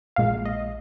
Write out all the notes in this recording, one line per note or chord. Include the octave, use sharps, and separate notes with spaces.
A#1 A#2 G#3 F5
D#5